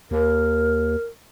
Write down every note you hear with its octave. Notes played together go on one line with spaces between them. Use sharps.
D#2 A#4